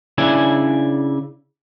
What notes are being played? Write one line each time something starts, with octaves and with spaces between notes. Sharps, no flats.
C#3 D4 E4 D5 G#5